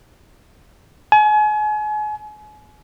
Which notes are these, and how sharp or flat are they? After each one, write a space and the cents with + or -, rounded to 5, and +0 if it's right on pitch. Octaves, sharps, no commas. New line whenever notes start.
G#5 +35